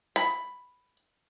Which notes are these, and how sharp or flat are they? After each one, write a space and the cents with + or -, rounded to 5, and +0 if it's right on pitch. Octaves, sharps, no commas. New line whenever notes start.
B5 +5